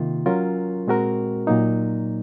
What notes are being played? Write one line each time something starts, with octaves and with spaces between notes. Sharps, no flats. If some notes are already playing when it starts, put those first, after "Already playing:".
Already playing: C3 D#3 A#3 F4
F#3 C#4 F4 A#4
A#2 G#3 C4 F#4 A#4
A#2 F#3 A#3 D#4